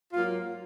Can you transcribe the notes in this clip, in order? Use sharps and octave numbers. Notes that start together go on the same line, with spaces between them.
G#2 F#3 A#3 F4